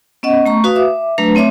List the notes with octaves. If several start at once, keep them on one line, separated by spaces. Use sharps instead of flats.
B3 C#4 D#5 F#5
A3 A#5 C#6
F#4 B4 F5 D#6
E5 D6
F#3 A3 D4 B4 A#5
A3 C4 C#5 E5 D6